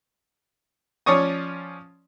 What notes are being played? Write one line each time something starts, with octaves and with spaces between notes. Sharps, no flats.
F3 C#4 C#5 D5 C#6 D#6